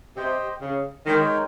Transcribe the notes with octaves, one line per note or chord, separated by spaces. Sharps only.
C3 G4 C5 D#5 G5
C#3
D#3 G#3 D#4 A#4 C#5 G5